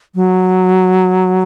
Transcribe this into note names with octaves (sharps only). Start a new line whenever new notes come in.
F#3